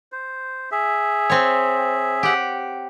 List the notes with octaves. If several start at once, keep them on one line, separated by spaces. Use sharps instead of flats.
C5
G#4 E5
C4 C#5
G4 F#5